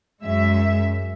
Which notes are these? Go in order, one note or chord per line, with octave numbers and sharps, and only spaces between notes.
F#2 G#3 E5